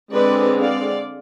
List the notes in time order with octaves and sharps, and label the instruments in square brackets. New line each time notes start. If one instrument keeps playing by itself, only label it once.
[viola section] D3 G#3 C4 B4 D5
D5 F5